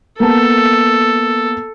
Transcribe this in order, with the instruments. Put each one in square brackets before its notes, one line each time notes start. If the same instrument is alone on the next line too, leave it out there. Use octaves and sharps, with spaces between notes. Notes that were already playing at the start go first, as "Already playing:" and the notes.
[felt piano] A#3 B3 A5 [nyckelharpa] A4